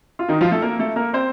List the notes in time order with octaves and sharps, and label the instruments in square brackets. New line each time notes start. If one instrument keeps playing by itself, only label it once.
[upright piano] F4
D#3 D#4
F3 F4
A3 A4
A#3 A#4
A3 A4
A#3 A#4
C4 C5